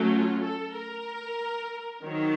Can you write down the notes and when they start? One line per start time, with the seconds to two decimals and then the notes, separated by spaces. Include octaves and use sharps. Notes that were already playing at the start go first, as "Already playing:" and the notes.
Already playing: F#3 A3 C#4
0.11 F4
0.43 A4
0.75 A#4
2.04 D#3 F#3 C4 C#5